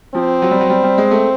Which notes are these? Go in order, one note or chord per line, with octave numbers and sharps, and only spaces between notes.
F3 C4
F#3
G3
F#3
G3
G3
G#3
A3